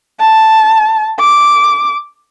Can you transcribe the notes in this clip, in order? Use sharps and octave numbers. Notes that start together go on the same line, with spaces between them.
A5
D6